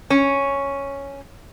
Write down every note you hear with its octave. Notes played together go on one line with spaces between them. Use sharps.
C#4